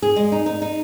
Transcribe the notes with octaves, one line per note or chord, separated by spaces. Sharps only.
G#4
G#3
D#4
D#4
D#4